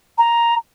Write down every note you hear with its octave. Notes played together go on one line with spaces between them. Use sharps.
A#5